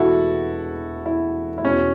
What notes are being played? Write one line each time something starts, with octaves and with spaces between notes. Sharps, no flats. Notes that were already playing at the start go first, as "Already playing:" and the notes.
Already playing: E1 E2 B2 E4 F#4 A4
E4
E4
E1 E2 B2 C#4